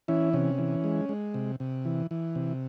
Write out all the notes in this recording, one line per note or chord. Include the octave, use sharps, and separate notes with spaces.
E3 C#4 E4
C3 C#4
E3
G#3
G#3
C3
C3
E3
E3
C3